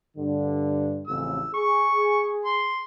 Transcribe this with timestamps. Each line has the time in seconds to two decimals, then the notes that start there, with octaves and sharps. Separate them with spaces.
0.16 G2 D3
1.07 A1 F2 C#3 E6
1.54 G#4 C#6
2.45 C6